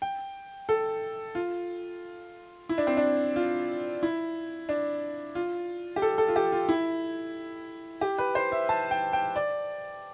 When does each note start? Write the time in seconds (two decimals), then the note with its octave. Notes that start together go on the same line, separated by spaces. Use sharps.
0.02 G5
0.69 A4
1.35 F4
2.69 E4
2.78 D4
2.87 C4
2.97 D4
3.36 F4
4.03 E4
4.69 D4
5.35 F4
5.96 G4
6.02 A4
6.18 A4
6.28 F4
6.36 G4
6.52 F4
6.69 E4
8.01 G4
8.18 B4
8.35 C5
8.52 E5
8.69 A5
8.91 G5
9.13 G5
9.36 D5